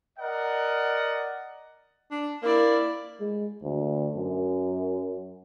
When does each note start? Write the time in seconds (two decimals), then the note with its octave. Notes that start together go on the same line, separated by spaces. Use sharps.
0.18 A#4 D5 D#5 F#5
2.11 D4
2.43 A#3 E4 D5
3.20 G#3
3.62 D2
4.16 F#2